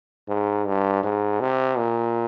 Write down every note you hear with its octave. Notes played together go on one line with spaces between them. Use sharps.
G#2
G2
G#2
C3
A#2